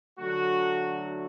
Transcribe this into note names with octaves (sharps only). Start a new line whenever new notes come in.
D3 F#3 A3 F#4